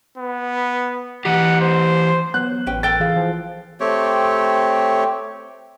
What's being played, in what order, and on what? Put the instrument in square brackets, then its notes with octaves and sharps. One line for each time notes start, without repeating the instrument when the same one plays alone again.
[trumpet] B3
[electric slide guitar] E3 G4 [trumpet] F#5
[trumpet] C5
[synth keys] F#3 B3 [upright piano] F#6
[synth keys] A1 [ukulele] C#4 B4 G5
[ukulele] A4 A#4 G5 [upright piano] A6
[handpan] E3 G#4 F5
[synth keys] F3
[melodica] A3 C4 G4 C#5